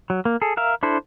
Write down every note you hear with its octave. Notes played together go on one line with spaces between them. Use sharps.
F#3
A#3
G#4 A4
A#4 E5 F5
D4 E4 A4 C5